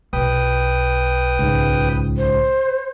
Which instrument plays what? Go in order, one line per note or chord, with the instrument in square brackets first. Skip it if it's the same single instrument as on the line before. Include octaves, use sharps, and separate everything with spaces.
[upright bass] B1 [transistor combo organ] B4 G5 D#6
[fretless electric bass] C#2 G#2
[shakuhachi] C5